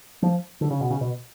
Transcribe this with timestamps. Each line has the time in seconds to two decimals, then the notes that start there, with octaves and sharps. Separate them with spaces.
0.22 F3
0.61 D3
0.71 C#3
0.81 B2
0.90 C#3
1.01 B2